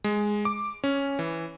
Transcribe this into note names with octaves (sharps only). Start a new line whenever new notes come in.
G#3
D6
C#4
E3